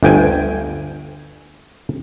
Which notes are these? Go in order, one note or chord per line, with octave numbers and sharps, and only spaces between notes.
G1 D2 G5 G#5